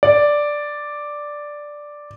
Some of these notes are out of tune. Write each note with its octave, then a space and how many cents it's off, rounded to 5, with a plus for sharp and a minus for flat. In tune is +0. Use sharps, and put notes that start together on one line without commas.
D5 +0